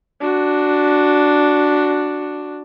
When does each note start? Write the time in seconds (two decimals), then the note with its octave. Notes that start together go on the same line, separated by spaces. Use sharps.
0.21 D4 F#4